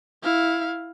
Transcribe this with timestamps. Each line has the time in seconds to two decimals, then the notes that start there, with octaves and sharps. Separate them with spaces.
0.23 E4 F5